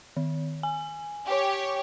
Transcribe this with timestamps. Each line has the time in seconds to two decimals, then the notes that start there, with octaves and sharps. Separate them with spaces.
0.17 D#3
0.63 G#5
1.26 G4 C#5